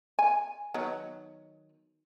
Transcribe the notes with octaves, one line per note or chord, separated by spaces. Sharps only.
G#5
D#3 F#3 B3